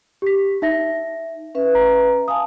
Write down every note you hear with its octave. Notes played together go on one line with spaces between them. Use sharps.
G4 B6
D#4 E5 A#6
C#4 B4 E5
A#5
F5 G#5 A5 D#6